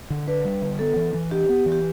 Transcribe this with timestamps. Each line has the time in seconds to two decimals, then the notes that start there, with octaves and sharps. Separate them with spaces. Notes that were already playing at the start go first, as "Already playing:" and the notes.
0.10 D3
0.27 D4 B4
0.45 G3
0.62 D3
0.79 B3 A4
0.96 E3
1.14 E3
1.31 D4 G4
1.49 B3
1.66 E3
1.72 G4